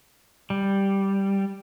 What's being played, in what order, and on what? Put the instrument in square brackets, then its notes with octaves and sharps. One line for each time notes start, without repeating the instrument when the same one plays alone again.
[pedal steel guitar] G3